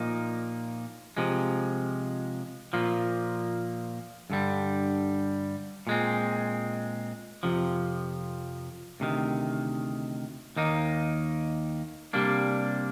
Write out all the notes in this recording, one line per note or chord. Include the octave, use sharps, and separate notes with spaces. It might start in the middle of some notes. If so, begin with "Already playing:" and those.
Already playing: A#2 F3 A#3 D#4
C3 F3 G#3
A#2 F3 A#3
G2 D3 G3
A#2 G#3 C4
F2 C3 F3
D2 C3 D#3
D#2 D#3 A#3 D#4
C3 G3 A#3 D4